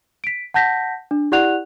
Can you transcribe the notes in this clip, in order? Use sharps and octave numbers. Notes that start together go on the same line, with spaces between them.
B6 D7
F#5 A5 G6 A#6 B6
D4
E4 G4 D5 F#5 F#6 F7